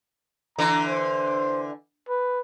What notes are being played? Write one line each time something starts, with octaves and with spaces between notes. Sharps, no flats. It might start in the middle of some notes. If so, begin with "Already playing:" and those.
D3 E3 A#5
C5
B4